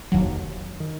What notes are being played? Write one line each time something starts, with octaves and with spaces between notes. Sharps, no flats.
F1 D#2 D#3 F#3
D#3